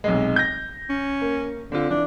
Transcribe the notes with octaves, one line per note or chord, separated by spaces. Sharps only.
B1 C3 G#3
G6 A#6
C#4
A#3
D3 C4 F4
E3 D4